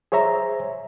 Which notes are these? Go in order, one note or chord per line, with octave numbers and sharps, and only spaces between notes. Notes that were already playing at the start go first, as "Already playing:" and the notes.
G#4 C5 C#5 E5 A#5